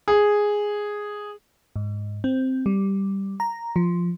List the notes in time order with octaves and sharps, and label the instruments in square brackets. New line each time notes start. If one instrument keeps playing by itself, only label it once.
[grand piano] G#4
[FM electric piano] G#2
C4
G3
A#5
F3